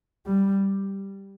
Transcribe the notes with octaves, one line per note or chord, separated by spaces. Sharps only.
G3